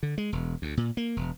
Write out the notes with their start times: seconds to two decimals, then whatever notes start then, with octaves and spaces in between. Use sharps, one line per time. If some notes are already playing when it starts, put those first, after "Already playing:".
0.03 D3
0.18 G#3
0.33 E1
0.62 D2
0.77 A#2
0.97 A#3
1.17 E1